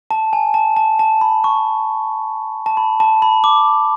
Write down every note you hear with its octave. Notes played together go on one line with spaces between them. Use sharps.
A5
G#5
A5
A5
A5
B5
C#6
A5
B5
A5
B5
D6